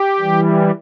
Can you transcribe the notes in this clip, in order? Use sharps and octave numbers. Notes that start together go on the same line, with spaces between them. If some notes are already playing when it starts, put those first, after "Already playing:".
Already playing: G4
E3 G3